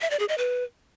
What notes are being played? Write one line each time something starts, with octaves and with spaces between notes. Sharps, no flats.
E5
D5
G#4
D#5
B4